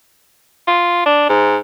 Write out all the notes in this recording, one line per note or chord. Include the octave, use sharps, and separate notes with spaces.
F4
D4
G#2